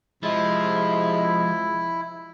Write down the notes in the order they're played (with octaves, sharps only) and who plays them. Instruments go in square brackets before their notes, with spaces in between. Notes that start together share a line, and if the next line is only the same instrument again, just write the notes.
[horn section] C3 G#3 [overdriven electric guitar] F3 [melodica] E4